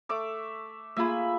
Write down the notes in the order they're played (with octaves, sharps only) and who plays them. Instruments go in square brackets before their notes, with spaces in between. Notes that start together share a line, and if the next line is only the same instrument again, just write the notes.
[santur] A3 E5 D6
[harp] A#3 F4 G#4 [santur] E5 B5